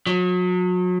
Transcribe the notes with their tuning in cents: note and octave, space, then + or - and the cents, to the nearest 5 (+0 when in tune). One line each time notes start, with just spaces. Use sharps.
F#3 -35